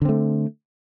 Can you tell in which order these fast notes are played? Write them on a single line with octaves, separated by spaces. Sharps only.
D3 C4 A3